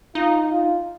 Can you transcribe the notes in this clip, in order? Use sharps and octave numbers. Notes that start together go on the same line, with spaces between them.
D#4 F4
F4